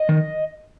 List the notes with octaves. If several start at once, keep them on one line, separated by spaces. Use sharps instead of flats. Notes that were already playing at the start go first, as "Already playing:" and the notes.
Already playing: D#5
D#3